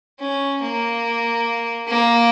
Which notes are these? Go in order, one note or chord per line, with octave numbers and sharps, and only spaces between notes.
C#4
A#3
A#3